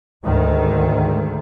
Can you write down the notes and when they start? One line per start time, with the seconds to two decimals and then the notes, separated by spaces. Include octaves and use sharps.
0.24 D2 G#2 D#3